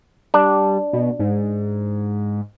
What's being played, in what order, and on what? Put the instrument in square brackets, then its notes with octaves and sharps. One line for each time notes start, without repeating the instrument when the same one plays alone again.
[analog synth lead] G3 [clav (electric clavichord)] D4
[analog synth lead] B2
G#2